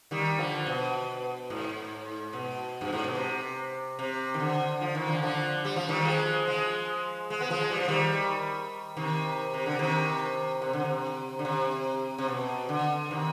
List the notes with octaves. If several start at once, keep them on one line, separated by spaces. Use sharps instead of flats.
D#3 G3
D3 F3
B2
G#2
B2
G2
G#2
B2
C3
C3
D#3
D3
F3
D#3
D3 F3
D3 F3
G3
F3
D#3 G3
F3 G#3
F3 G#3
G#3
B3
F3 G#3
G3
F3
D#3 G3
C3 D#3
C3
D3
C3 D#3
C3
D3
C3
D3
C3
C3
B2
D3
C3 D#3